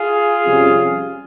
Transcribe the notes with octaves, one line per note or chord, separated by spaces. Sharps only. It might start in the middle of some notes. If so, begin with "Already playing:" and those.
Already playing: F4 G#4
F2 C3 G3 C#4